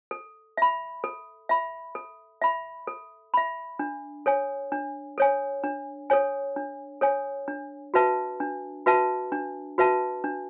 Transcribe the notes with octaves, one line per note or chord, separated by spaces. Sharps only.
A4
E5 B5
A4
E5 B5
A4
E5 B5
A4
E5 B5
D4
A4 C#5 G#5
D4
A4 C#5 G#5
D4
A4 C#5 G#5
D4
A4 C#5 G#5
D4
F#4 B4 E5 A5
D4
F#4 B4 E5 A5
D4
F#4 B4 E5 A5
D4